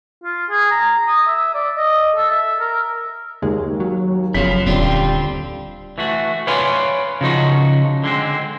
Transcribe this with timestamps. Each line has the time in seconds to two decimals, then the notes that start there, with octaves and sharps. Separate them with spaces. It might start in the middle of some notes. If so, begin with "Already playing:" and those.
0.24 F4
0.50 G#4
0.71 A#5
1.07 D#6
1.27 E5
1.55 D5
1.77 D#5
2.16 A4
2.31 E5
2.60 A#4
3.42 D#2 G#3
3.80 F#3
4.34 F#1 F#2 C#3 F3 B3 B6
4.66 D#1 D3 G3 C4 F4
5.98 E3 A3 F#4
6.47 B4 C#5 D5 F5 G#5 C6
7.21 C#3 F3 D#4 F#4
8.04 D3 G#3 C4